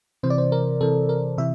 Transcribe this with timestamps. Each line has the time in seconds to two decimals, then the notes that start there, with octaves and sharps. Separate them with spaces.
0.23 C3 E3 C5
0.30 D5
0.38 C5
0.52 A#4
0.81 C3 E3 A4
1.09 A#4
1.38 C3 E3 E5